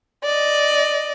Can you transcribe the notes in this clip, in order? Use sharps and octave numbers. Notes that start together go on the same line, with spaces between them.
D5 D#5